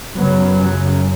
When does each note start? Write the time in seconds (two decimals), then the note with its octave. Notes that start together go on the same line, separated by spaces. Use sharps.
0.15 F#2 C#3 F#3 B3
0.59 C#3 F#3